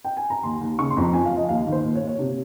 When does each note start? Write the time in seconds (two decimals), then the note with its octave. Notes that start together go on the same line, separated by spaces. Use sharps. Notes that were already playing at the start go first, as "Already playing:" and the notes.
0.04 G5
0.17 G#5
0.30 A#5
0.43 D#2 C6
0.61 D#2
0.78 C#3 C#6
0.91 C6
0.97 F2
1.02 A#5
1.13 F3 G#5
1.25 F5
1.31 F3
1.37 D#5
1.49 D#2 F5
1.67 D#3
1.72 C5
1.84 A#2
1.95 C#5
2.01 A#2
2.08 C#5
2.19 C3